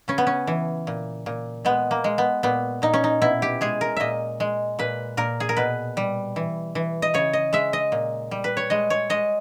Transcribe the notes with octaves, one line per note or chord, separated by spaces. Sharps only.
C#3 C#4
B3
C#4
E3
A#2
A#2
G#3 B3
A#3
G#3
B3
A#2 B3
A#2 D#4
C#4
D#4
B2 E4
G4
G#3 G#4
A#4
A#2 D#5 E5
G#3
A#2 B4
A#2 A#4
G#4
A#4
B2 B4
G3
E3
E3
D#5
C#3 C#5
D#5
G#3 E5
D#5
A#2
G3
B4
C#5
G#3 D#5
C#5
G#3 D#5